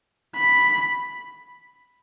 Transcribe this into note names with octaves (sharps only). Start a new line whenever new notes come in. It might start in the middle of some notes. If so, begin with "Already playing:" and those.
B5